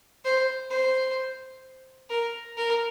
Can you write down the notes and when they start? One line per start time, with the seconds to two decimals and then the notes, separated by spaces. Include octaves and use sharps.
0.25 C5
0.71 C5
2.10 A#4
2.57 A#4